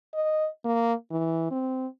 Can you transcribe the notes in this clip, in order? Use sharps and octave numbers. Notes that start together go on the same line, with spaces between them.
D#5
A#3
E3
C4